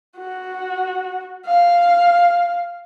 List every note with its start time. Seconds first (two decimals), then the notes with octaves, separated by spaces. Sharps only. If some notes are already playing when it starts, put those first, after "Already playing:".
0.18 F#4
1.46 F5